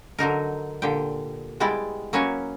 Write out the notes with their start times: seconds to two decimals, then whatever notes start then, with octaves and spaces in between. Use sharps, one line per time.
0.19 D3 F#3 D#4 A#4
0.82 A#2 D3 G4 G5
1.60 G3 G#3 B3 E4 D5 G5
2.13 F#3 A#3 C#4 B4 C#5